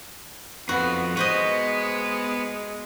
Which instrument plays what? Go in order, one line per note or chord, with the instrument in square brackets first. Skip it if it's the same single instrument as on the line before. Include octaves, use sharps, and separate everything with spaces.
[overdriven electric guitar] F2 [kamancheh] B3 [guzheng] F#4
[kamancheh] G#3 [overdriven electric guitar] B3 [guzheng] F#4 C5 D#5